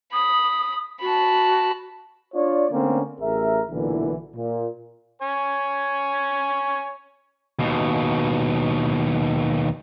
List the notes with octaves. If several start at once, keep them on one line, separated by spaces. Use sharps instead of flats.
B5 D#6
F#4 A5 B5
D4 F4 C#5 D5
D3 A3 A#3 C4 C#4
A1 G#4 A#4 E5
B1 A#2 D3 E3
A#2
C#5 G#5
D#2 B2